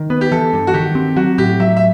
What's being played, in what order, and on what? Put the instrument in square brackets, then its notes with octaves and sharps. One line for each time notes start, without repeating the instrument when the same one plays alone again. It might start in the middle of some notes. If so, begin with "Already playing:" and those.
Already playing: [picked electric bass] D#3
[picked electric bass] B3 [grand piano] B4
[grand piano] G4
[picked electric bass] E3 [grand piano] A4
[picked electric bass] G2
[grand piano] F#4
[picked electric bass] D#3 [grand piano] G4
[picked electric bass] C4
[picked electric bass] F#3 [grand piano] F#4
[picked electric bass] A2 [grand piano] G4
[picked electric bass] F#3 [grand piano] E5
[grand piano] E5